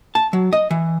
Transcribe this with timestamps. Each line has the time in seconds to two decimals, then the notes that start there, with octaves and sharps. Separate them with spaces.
0.15 A5
0.33 F#3
0.53 D#5
0.71 E3